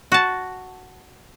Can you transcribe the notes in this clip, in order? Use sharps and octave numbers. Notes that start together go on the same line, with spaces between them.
F#4 A5